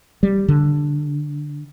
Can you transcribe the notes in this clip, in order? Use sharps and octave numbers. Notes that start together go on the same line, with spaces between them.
G3
D3